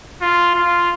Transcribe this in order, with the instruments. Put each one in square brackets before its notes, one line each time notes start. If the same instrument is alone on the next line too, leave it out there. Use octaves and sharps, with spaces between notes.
[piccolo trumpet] F4
F4